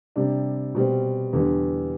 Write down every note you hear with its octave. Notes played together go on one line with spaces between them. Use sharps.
C3 G3 D4
B2 G3 C4
E2 D3 G3